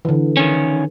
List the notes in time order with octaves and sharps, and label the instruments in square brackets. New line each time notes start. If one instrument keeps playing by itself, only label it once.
[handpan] D3 E3
[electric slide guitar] D#3 C#4